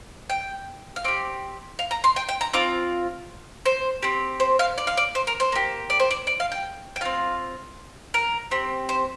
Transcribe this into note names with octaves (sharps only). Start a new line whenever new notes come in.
G5
F5
C4 G4 D5
F5
A#5
C6
G5
G5
A#5
C4 F4 D6
C5
C4 G4
C5
F5
D5
F5
D5
C5
A#4
C5
A#3 G4
D5
C5
D5
D5
F5
G5
G5
C4 F4 F5
A#4
C4 G4
C5